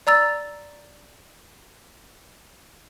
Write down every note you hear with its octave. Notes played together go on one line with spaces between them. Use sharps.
D5 A#5 E6 A6